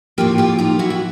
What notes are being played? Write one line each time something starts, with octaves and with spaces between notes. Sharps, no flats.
A2 F3 A#3 F4 G4
F4 G4
D#4 F4
E4 F#4
F#4